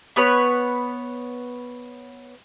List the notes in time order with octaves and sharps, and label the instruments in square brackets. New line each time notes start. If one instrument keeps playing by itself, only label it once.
[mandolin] B3 B4 C#5